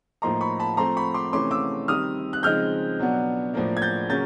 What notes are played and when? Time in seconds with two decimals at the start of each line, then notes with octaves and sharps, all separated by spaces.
0.22 A2 F3 A#3 D#4 A#5 C6
0.41 B5 C#6
0.59 A5 B5
0.77 F3 A3 C4 A#5 C6
0.97 B5 C#6
1.14 C6 D6
1.33 C3 E3 A3 C#4 C6 D6
1.51 D6 E6
1.88 D#3 G3 C4 D#6 F6
2.33 F#6
2.43 C#3 F3 G#3 C4 D#4 F6 G6
2.99 B2 F#3 B3 D4
3.54 A2 F3 A#3 D4
3.77 G#6
3.82 G6 A6
4.09 C#3 F#3 A#3 C#4 G6 A6